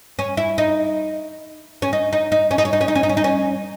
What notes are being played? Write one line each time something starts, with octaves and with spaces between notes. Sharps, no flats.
C#4
E4
D#4
C#4
D#4
D#4
D#4
C#4
D#4
C#4
D#4
C#4
D#4
C#4
D#4
C#4
D#4
C#4